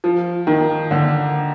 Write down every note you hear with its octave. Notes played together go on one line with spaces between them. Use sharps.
F3
D#3
D3